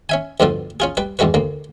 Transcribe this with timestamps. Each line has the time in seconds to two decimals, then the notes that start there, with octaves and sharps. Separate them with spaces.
0.09 C#4 E5 G#5
0.40 D2 G2 B2 D3 F3
0.80 C#4 F4 G#4
0.97 G3 B4
1.19 E2 G2 G#3 F#4 B4
1.34 D2 A#3